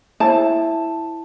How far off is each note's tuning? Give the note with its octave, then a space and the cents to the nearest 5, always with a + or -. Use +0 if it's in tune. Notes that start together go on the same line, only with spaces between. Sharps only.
E4 +0 C5 +35 A5 +0